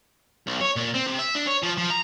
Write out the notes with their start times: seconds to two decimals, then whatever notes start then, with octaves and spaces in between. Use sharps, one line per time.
0.47 B1
0.61 C#5
0.76 A#2
0.94 C4
1.07 C3
1.19 E5
1.35 D4
1.47 C#5
1.63 F3
1.78 F3
1.90 A#5